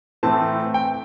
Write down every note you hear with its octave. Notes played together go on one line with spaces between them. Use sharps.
A2 E3 A3 C4 A5
G5